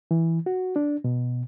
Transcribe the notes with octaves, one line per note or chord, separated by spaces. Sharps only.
E3
F#4
D4
B2